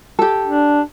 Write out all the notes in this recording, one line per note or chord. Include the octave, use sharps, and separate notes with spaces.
G4 A4
D4